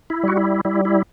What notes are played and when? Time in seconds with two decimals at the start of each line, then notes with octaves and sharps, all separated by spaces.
0.10 E4
0.23 G3 F#4
0.37 E4
0.65 G3 E4
0.85 E4